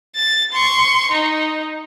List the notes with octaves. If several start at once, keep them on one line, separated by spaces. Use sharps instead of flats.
A6
C6 C#6
D#4